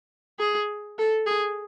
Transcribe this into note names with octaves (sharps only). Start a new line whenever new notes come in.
G#4
A4
G#4